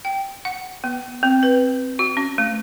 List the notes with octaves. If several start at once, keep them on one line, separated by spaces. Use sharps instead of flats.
G5
F#5
B3
C4
B4
F#4
C#4
A3